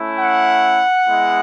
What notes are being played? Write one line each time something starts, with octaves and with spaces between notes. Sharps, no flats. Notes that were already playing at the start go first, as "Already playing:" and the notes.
Already playing: A3 C#4 E4
F#5
G#3 B3 E4